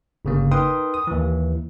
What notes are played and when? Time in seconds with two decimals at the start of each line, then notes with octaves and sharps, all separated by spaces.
0.25 G1 C#3 A#3
0.51 D#4 A#4 B4 G5 C6 D#6
0.94 D#6
1.07 D#2 E3